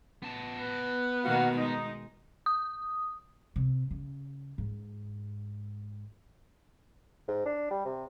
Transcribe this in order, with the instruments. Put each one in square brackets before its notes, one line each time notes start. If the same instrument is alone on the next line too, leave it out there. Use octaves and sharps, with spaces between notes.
[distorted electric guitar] B3 A5
[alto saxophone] B4
[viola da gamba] B2 D#3 A#3 [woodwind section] F#4 F5 F#5
[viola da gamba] G#3 [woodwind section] D#4
[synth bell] D#6
[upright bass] C3
C#3
G#2
[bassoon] G#2
D4
G3
C3